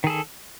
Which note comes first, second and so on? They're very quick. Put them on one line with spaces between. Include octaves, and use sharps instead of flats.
D#3 G#4 A4